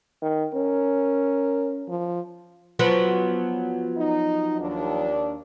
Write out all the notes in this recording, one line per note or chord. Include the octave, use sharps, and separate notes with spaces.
D#3
C#4 A#4
F3
F3 F#3 B3
D#4
D#2 D4